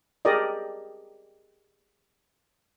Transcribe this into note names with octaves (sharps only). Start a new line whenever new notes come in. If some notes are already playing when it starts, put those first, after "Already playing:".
G4 G#4 A#4 D5 D#5